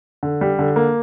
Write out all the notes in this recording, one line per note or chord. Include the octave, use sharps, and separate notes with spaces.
D3
G3
D3
A#3